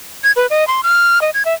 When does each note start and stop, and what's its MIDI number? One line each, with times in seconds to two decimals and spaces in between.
0.24 0.32 92
0.36 0.47 71
0.50 0.67 75
0.68 0.81 84
0.83 1.21 89
1.22 1.30 75
1.34 1.43 92
1.45 1.54 76